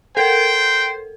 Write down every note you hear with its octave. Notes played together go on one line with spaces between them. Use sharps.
A4 A#4 C5 G5